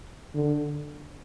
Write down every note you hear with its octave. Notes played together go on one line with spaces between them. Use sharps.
D3